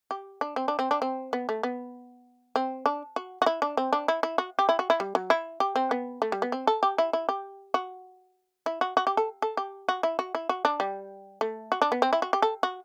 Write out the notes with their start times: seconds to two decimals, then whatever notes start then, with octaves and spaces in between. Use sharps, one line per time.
0.11 G4
0.41 D4
0.56 C4
0.68 D4
0.79 C4
0.91 D4
1.02 C4
1.33 B3
1.49 A3
1.63 B3
2.56 C4
2.86 D4
3.16 F#4
3.42 F#4
3.46 E4
3.62 D4
3.77 C4
3.93 D4
4.08 E4
4.23 E4
4.38 F#4
4.59 G4
4.69 E4
4.79 F#4
4.90 E4
5.00 G3
5.15 F#3
5.30 E4
5.60 G4
5.76 C4
5.91 B3
6.22 A3
6.32 G3
6.42 B3
6.52 C4
6.67 A4
6.83 G4
6.98 E4
7.13 E4
7.29 G4
7.74 F#4
8.66 E4
8.81 F#4
8.97 F#4
9.07 G4
9.17 A4
9.42 A4
9.57 G4
9.89 F#4
10.03 E4
10.19 F#4
10.35 E4
10.49 F#4
10.65 D4
10.80 G3
11.41 A3
11.72 F#4
11.82 D4
11.92 B3
12.02 C4
12.13 E4
12.22 F#4
12.33 G4
12.42 A4
12.63 F#4